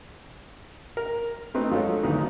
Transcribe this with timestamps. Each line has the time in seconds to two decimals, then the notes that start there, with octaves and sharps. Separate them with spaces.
0.97 A#4
1.54 A3 C4 D#4 B4
1.71 F3 F#3 G#3 A4 C#5
2.03 G#1 D2 F3 B3 D#4